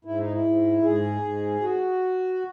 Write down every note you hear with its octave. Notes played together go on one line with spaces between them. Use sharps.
G#2 E4
D#4
E4
G#2
G#2 G#4
G#2
F#4